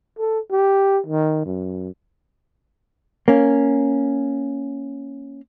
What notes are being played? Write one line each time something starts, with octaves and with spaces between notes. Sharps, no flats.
A4
G4
D#3
F#2
A#3 C#4